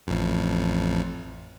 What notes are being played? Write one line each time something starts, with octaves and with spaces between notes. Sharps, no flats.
A1 F2